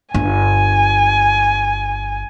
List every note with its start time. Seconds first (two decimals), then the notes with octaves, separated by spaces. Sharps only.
0.14 G1 G#5